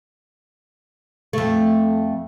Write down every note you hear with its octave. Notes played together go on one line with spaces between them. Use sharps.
F2 A3